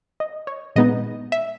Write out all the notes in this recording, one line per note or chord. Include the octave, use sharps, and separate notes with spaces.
D#5
C#5
A#2 G#3 B3 D#4 D#5
E5